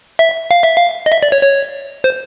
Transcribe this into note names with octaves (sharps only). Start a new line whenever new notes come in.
E5
F5
E5
F5
D#5
E5
D5
C#5
C#5
C5